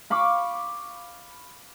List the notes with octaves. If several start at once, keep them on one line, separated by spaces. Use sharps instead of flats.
F5 B5 C#6 D6